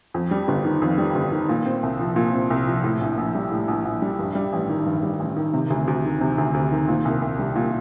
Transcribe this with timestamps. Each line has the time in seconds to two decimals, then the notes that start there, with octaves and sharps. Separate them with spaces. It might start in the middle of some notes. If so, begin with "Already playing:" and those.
0.14 F2
0.31 G3
0.48 G1
0.65 D#3
0.82 F2
0.98 G3
1.15 G1
1.32 D#3
1.49 A#2
1.65 C4
1.83 C2
1.99 F3
2.16 A#2
2.34 C4
2.50 C2
2.67 F3
2.84 A2
3.01 A#1
3.18 A#1
3.35 G3
3.51 A2
3.68 A#1
3.85 A#1
4.02 G3
4.19 G2
4.35 G3
4.53 A1
4.69 D#3
4.86 G2
5.03 G3
5.20 A1
5.37 D#3
5.54 C3
5.70 D2
5.88 D2
6.04 D#3
6.21 C3
6.38 D2
6.54 D2
6.72 D#3
6.88 A#2
7.05 C2
7.22 C2
7.39 G3
7.56 A#2